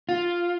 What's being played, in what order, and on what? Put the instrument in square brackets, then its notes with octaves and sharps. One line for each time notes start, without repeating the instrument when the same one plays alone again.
[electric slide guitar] F4